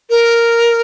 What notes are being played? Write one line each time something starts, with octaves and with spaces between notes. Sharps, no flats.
A#4